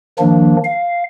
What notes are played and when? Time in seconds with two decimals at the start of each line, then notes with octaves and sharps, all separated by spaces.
0.19 D#3 F3 A#3 D4
0.64 F5